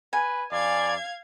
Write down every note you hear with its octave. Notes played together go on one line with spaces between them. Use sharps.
B4 G#5
F2 D5 F5 G#6